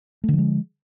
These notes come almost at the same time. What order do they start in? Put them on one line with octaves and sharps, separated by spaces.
A3 D3 F3 G#3